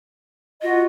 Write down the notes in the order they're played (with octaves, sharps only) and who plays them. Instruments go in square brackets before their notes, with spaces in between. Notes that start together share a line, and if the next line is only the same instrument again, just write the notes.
[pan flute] F4 [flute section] F#4 D#5